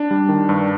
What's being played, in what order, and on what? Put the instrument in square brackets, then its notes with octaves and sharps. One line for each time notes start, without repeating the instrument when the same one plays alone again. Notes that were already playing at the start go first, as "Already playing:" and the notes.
Already playing: [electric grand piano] D4
G3
D#3
G2